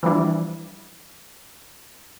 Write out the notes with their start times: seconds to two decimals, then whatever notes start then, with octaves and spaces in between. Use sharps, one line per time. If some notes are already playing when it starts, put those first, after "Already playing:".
0.03 E3 F3 G3 D4 E4